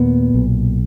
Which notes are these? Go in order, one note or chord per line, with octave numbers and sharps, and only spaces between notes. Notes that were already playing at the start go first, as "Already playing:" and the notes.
Already playing: D#2 A#2 B3
B1